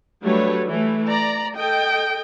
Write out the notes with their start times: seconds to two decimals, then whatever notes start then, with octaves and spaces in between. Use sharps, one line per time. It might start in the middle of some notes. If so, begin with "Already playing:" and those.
0.22 F#3 G3 A3 D4 B4 C#5
0.67 E3 A3
1.06 D5 A#5
1.56 A4 D#5 G5